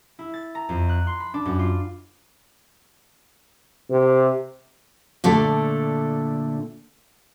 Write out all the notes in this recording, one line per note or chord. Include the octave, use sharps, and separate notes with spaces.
E4
A6
A#5
F2
F#6
C6
B5
D4
F#2
F4
C3
A#2 D3 A3